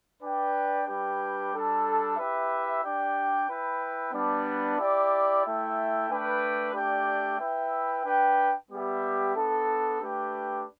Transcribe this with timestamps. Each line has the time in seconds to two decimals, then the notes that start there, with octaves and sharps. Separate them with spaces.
0.21 D4 B4 D5 G5
0.87 G3 D4 G4 B4 G5
1.52 G3 D4 A4
2.17 E4 G4 B4 E5
2.83 D4 G4 D5 G5
3.48 E4 B4 G5
4.13 G3 B3 D4
4.78 E4 G4 D5
5.44 A3 E4 A4 E5 G5
6.09 A3 D4 B4 G5
6.74 A3 D4 G4 D5 G5
7.39 E4 B4 E5 G5
8.04 D4 B4 G5
8.70 G3 B3 G4 E5
9.35 B3 D4 A4
10.00 A3 D4 G4 B4 G5